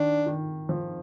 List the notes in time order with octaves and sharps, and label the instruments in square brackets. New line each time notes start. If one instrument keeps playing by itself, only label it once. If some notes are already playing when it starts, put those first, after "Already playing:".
Already playing: [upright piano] D#3 [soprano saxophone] D4
[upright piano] D#3
F3